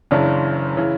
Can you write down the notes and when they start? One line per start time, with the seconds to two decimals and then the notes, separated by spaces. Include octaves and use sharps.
0.11 F#1 F#2 C#3 E3 D4
0.77 C#3 E3